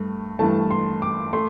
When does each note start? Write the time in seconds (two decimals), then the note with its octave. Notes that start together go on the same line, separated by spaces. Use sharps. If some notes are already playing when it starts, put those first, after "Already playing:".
Already playing: G2 A3
0.39 G2 E3 A3 A5
0.70 C6
1.02 D6
1.33 A3 C6